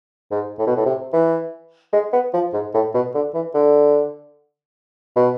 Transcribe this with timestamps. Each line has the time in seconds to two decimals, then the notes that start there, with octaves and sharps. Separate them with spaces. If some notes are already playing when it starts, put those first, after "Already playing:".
0.31 G#2
0.59 A2
0.67 B2
0.76 A2
0.85 C3
1.13 E3
1.93 G#3
2.13 B3
2.33 F3
2.53 G#2
2.74 A2
2.94 B2
3.15 D3
3.34 E3
3.54 D3
5.16 B2